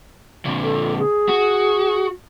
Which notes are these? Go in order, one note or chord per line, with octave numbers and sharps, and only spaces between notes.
A#2 D3
A4
G#4
F#4